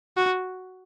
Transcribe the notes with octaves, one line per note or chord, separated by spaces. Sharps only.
F#4